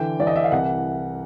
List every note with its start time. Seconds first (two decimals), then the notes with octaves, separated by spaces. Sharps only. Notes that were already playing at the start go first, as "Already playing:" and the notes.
Already playing: D3 E3 G5
0.20 E3 D5
0.27 D#5
0.36 E5
0.44 F5
0.52 C2 F#5